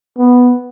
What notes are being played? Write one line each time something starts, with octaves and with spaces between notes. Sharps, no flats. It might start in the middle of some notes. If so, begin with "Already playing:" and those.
B3